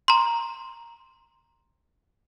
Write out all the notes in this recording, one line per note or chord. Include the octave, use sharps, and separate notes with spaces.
A#5 C6